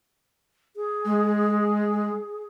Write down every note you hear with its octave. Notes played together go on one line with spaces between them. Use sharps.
G#4
G#3